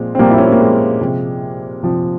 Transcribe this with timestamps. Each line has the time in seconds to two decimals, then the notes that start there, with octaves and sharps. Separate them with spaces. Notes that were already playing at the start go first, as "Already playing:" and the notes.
Already playing: A#2 F3 G#3 C4
0.15 C4
0.19 A#2 F3 G3 A#3
0.31 E4
0.38 C#4
0.45 C4
0.52 A#3
0.60 G#3
1.01 C3 F3
1.83 C3 F3